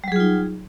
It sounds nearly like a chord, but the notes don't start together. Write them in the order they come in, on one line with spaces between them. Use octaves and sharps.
G3 F#3 G#4 F4 D#4